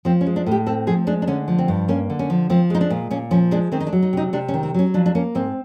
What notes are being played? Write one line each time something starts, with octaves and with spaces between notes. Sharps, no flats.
F3 C4
C#4
G#3
D4
A2 G4
C4 A4
F3 G#4
G#3 D4
D4
D3 C#4
F3
C4
G2
A#3 C#4
D3
C#4
F3
F3 C4
G#3 D#4
D4
A#2
A#2 C#4
F3 C#4
G#3 D4
D#3 C4
D#4
D4
F#3
D#4
C3 D#4
C3 D4
C#4
D#3
C4
F#3 C#4
F3 D4
D4
A#3 C#4
G#2 C4